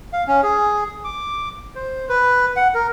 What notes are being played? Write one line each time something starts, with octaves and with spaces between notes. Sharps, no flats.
F5
C#4
G#4
D6
C5
B4
F#5
A#4